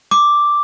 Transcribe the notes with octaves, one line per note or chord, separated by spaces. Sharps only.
D6